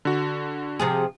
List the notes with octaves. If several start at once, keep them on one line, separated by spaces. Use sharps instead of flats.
D3 F#4
C3 F3 G#4